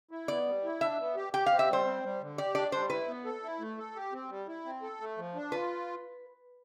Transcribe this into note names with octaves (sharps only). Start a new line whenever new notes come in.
E4
B3 D5
G3
E4
D4 E5
B3
G4
G4 G5
C4 F5
E5
G3 C5
C4
G3
D3
G4 D5
D4 D5
G3 C5
E4 B4
B3
A4
E4
A3
A4
G4
C4
G3
E4
C4
A4
A3
F3
D4
F4 B4